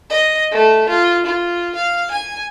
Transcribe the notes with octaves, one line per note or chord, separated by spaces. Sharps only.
D#5
A3
F4
F4
F5
G#5